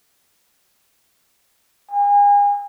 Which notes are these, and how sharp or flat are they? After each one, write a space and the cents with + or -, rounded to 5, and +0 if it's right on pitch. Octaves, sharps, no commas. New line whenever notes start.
G#5 -35